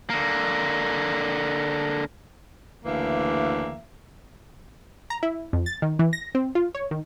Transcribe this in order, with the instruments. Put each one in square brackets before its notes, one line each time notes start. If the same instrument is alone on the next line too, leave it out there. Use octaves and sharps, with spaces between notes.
[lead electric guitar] D3 A#3
[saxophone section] D2 C#3 E3 A#3 E5
[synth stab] A#5
E4
F2
A6
D#3
E3
A#6
C4
F4
C#5
D#3